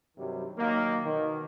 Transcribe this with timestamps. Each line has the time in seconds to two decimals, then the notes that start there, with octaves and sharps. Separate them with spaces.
0.16 G2 C3 D#3 F#3 G3
0.58 D#3 F#3 A#3
1.05 B2 D#3